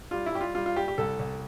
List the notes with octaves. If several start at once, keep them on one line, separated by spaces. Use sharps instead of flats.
G3 F4
E4
G3 G4
F4
G3 F4
F4
G3 G4
G4
C2 A4
C2